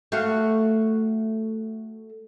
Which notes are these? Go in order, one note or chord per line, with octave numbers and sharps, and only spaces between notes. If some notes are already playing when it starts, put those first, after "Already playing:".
A3 F#4 F5